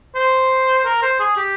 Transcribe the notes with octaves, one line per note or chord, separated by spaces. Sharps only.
C5
A#4
C5
G#4
G4